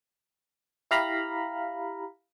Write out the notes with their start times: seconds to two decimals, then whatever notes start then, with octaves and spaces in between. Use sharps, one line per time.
0.91 E4 G4 F5 A#5 B5